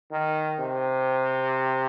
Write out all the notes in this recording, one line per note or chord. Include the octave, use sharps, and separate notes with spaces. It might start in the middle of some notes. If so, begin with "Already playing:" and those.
D#3
C3